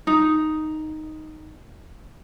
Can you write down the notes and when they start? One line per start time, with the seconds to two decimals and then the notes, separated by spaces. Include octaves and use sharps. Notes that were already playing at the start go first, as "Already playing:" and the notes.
0.07 D#4